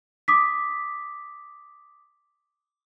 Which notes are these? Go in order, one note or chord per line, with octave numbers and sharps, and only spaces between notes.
D6 D#6 B6